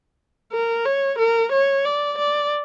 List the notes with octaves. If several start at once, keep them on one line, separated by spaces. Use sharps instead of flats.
A#4
C#5
A#4
C#5
D5
D5